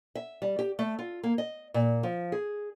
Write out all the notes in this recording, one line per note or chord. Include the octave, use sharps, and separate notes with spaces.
E5
G3
G4
A3
F4
A#3
D#5
A#2
F3
G#4